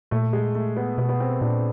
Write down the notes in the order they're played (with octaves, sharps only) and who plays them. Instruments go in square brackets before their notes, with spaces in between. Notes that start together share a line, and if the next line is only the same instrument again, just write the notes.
[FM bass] A#2 [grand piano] A3
[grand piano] G#3
A3
B3
[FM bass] B2 [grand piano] B3
[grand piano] B3
C4
[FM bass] A#2 [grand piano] D4